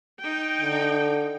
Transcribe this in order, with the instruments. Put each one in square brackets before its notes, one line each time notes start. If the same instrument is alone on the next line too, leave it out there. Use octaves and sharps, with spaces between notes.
[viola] D#4 G5
[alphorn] D3